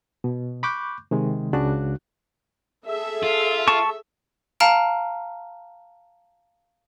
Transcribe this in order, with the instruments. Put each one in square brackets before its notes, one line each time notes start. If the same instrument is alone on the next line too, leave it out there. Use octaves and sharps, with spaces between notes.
[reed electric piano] B2
B5 C#6 D6 F#6 G6
C3 D#3 G#3
C#2 C#3 D4 F#4 F#6
[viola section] G#4 A4 E5
[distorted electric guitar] F4
[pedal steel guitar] A5 C#6
[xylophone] F5 A5 A#5 F6 C#7 D7